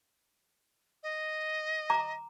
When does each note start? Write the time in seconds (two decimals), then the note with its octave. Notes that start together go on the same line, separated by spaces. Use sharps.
1.03 D#5
1.90 A#5 D6